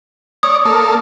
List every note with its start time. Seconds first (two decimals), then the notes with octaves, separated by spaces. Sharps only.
0.43 C#5 D5 D#6
0.65 A#3 A4